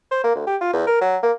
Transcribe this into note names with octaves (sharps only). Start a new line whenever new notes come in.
C5
A#3
D2
G4
F4
E2
A#4
F#3
A#3